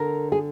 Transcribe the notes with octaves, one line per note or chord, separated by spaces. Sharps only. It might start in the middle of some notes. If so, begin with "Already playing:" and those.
Already playing: D3 A#4
G#4